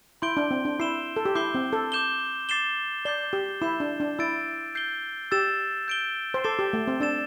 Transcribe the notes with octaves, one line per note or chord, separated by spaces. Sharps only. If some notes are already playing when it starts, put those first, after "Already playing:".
E4 C6 G6 D7 G7
D4
C4
D4
E4 E6 C7 E7 G7
A4
G4
E4 D6 G6 C7 G7
C4
A4
D6 G6 E7 G7
D6 A6 C7 E7 G7
D5 G6 C7 G7
G4
E4 G6 C7 E7
D4
D4
E4 E6 A6 D7
G6 C7 G7
G4 E6 A6 E7
G6 D7 G7
C5
A4 D6 A6 C7 E7 G7
G4
A3
C4
D4 E6 A6 E7